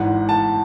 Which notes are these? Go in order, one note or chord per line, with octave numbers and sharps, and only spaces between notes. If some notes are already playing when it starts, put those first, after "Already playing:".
Already playing: G#1 G#2 E3 F#5
A5